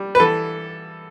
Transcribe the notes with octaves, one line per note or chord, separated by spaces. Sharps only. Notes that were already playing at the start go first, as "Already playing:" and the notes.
Already playing: G3
B4
E3 A4